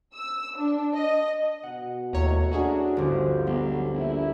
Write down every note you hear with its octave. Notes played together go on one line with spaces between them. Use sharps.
E6
D4
D#5
B2 F#5
D#2 A2 C#5 A#5
C#4 D4 F#4 G#4
G1 D2 F3 C5
B1 G3 B3
A#1 E4